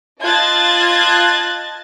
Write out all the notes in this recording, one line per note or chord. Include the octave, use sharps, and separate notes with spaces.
F4 D#5 A5 F#6 G#6 A6